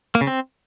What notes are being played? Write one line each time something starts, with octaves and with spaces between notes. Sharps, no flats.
A#3
C#3
C4